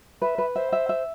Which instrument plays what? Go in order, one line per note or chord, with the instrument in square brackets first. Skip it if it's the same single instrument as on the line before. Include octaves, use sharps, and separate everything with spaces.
[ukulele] B4 [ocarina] E5
[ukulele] B4
[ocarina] C5 [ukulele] E5
[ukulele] E5
E5